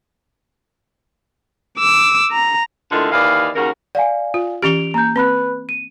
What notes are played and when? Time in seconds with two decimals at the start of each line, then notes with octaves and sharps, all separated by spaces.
1.79 D6 E6
2.32 A#5
2.92 A2 D3 D#3 G#3 A3 F4
3.12 D#2 E3 D5 D#5 F5
3.55 D#2 C#3 F#4 A#4
3.95 D5 F5 F#5 G#5
4.34 F4
4.62 E3 C#4 G4 D7 F7 G7
4.94 A#3 A#5 G6
5.16 C4 B4 B5 F#6
5.69 D#7